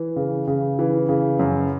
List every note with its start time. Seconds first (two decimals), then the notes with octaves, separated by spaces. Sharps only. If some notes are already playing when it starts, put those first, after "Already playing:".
Already playing: E3
0.16 C#3
0.47 C#3
0.79 E3
1.09 C#3
1.39 F#2